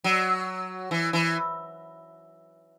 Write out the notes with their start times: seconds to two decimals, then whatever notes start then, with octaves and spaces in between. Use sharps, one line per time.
0.04 F#3
0.91 E3
1.13 E3